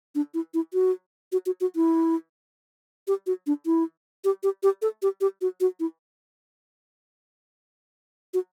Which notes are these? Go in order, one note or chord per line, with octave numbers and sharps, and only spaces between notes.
D4
E4
E4
F#4
F#4
F#4
F#4
E4
G4
F#4
D4
E4
G4
G4
G4
A4
G4
G4
F#4
F#4
E4
F#4